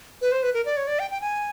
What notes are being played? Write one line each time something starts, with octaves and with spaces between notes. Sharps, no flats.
B4
C5
B4
A#4
D5
C#5
D5
G5
G5
G#5